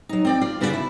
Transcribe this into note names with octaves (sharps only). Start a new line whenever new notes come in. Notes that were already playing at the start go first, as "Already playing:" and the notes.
F#3 D#4
C4 D5 G5
F4 D5
G2 C#3 B3 F#4 G4 D5
E4